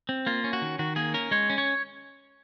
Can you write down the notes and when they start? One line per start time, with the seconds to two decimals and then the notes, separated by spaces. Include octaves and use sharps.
0.09 C4
0.27 A#3 F4
0.44 C#4
0.53 F#4
0.62 D#3
0.79 D#3 F#4
0.96 A#3 G#4
1.14 C#4 A#4
1.31 G#3 C#5
1.50 C#4
1.58 C#5